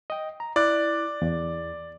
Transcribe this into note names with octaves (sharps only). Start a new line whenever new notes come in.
D#5 G5
A#5
E4 D5 F#6
E2